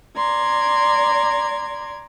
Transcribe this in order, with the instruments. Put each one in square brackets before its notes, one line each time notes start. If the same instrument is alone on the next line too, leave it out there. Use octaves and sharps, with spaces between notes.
[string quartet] D5 A#5 C6 G#6